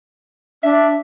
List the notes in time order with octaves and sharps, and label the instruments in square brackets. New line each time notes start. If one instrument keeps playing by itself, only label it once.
[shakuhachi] D4 [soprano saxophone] E5